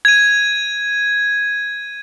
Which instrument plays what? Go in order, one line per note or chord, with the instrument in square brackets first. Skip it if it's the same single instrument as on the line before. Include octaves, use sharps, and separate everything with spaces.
[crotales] G#6 D#7